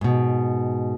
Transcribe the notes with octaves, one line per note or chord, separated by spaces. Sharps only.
G#2 B2